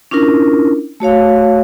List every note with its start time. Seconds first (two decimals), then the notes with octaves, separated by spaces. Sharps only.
0.11 C#4 D4 E4 F4 A#4
1.00 A3 F#4 C#5 F5